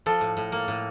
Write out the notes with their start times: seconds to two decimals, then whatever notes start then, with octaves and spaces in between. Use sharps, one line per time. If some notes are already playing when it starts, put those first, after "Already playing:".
0.06 F3 A4
0.21 A2
0.37 A2
0.52 A#3
0.68 A2